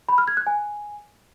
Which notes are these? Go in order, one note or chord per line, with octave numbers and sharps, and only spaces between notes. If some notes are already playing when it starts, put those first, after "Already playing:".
B5
F6
G#6
F#6
G#5